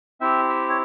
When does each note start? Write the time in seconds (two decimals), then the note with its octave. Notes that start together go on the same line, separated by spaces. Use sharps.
0.21 C4 E4 G4 E5 G5
0.49 E5 G5
0.69 C#5